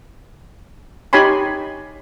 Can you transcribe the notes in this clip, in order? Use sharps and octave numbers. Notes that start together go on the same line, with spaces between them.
D#4 G4 C#5 G#5 B5 C6